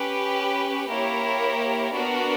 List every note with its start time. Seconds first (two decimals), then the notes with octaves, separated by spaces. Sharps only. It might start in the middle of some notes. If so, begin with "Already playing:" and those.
Already playing: C#4 G4 B4
0.90 A#3 E4 G4 A#4 C#5
1.95 B3 D4 F#4 A#4